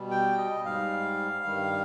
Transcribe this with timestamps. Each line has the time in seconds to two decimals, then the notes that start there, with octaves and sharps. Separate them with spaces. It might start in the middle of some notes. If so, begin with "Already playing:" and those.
Already playing: B2 G3
0.11 G5
0.38 D#5
0.64 G#2 G3 F5
1.45 G2 D#3 G3